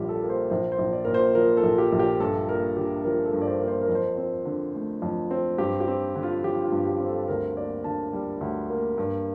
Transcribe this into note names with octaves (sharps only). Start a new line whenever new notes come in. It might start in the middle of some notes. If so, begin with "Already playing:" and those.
Already playing: A#1 A#2 G3 F4 G4
A4
A#3
C5
A#1 C5
C5
A#1
D5
A#2 A#4
C5
F3 A#4
A4
A#1
G4
A#1
G4
G2 A4
A#3 A#4
D3 G4
F3 A#4
A4
G2
D5
C5
A#3
C5
A#4
F2
C5
C4
D3
A3
F2
C4
G2 G4
G4
C4
D3
F4
F3 G4
F4
G2
G4
C4
A4
D2 A#4
A#3 D5
D3 A5
G3
D2
A#3
G2